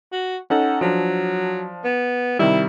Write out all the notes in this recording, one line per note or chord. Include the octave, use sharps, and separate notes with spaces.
F#4
C#4 D#4 A4 F#5
F3 F#3 D4
B3
C3 D#3 G3 E4